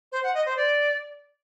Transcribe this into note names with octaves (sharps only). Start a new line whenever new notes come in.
C5
F#5
D#5
C5
D5